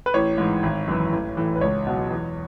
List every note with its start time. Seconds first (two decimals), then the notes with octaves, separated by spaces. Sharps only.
0.06 B4
0.14 A1 C#5
0.38 G#2 E3
0.63 G#1
0.88 F#2 E3
1.12 A1
1.37 A2 E3
1.56 B4
1.61 C#2 C#5
1.87 B2 F#3
2.11 E2